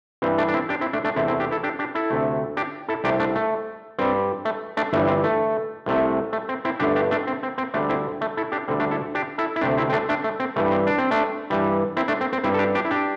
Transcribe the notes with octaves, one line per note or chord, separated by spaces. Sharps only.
G2 E3 G3 C4
A3 D4
D4
C4 E4
D4 G4
C4 E4
A3 D4
A3 D4
E2 C3 A3 C4 E4
C4 E4
D4 G4
E4 A4
D4 G4
D4 G4
E4 A4
D2 C3 A3
D4 G4
E4 A4
C2 C3 A3 D4 G4
A3 D4
A3
G2 G3 C4
A3
A3 D4
G1 G2 E3 G3 A3
C4
A3
C2 C3 A3
A3
C4
C4 E4
G1 G2 D3 A3 D4 G4
D4 G4
A3 D4
C4
C4
C4
D2 D3 G3 A3 D4
C4 E4
A3
E4 A4
D4 G4
D2 D3 G3 C4
A3 D4
E4 A4
D4 G4
E4 A4
E4
D2 C3 A3 D4 G4
C4 E4
C4
A3 D4
A3 D4
A3
C4
G2 E3 G3 A3
C4
D4
C4
A3 D4
G2 E3 G3
C4 E4
A3 D4
C4
C4
G2 G3 C4 E4
A4
D4 G4
D4 G4
E4
D4 G4